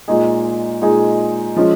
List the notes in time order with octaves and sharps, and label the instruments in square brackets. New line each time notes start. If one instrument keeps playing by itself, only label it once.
[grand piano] A#2 G#3 D#4 G#4
A#2 G#3 D#4 G#4
F3 G#3 C#4